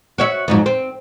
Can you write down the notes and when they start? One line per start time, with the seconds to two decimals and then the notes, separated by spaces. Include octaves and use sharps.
0.18 F#4 C#5 E5
0.48 F2 G#2 F#3
0.66 C4